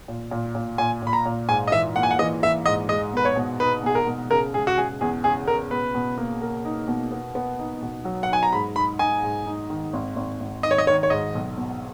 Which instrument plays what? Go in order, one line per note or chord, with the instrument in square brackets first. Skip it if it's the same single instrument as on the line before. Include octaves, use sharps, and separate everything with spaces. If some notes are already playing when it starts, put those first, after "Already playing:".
[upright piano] A#2
A#2
A#2
[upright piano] A#2 [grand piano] G#5
[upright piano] A#2 [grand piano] B5
[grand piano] A#5
[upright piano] A#2
[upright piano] G#2 [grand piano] G#5
[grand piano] D#5
[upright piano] E3 [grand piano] E5
[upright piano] A#3 [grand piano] F#5
[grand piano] G#5
F#5
[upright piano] E3 [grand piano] D#5
[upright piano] E3 [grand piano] E5
[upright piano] G#2 [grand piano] D#5
[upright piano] G#3 [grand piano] D#5
[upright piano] B2 [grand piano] B4
[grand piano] C#5
[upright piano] B2
[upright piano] D#4 [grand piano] B4
[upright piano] B2 [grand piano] G#4
[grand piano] A#4
[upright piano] B2
[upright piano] C#3 [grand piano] A#4
[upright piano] G#3 [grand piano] G#4
[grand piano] F#4
[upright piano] C#3 [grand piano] G#4
[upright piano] E2 [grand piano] G#4
[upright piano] C#3 [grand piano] G#4
[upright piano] C#3 [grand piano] A#4
[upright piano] B2 [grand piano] B4
[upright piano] B2
A#3
A#4
D#4
B2
B3
B3
D#4
B2
F#3
[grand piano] F#5
[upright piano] D#4 [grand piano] G#5
[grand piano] A#5
[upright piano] G#2 [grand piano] B5
[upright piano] D#4 [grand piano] B5
[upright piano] D#4 [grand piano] G#5
[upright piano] G#2
D#4
D#3
G#1
G#1
G#1
[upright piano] D#3 [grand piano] D#5
[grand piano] C#5
D#5
[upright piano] D#3 [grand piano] C#5
[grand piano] C#5
[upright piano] G#2 [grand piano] D#5
[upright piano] B1
B2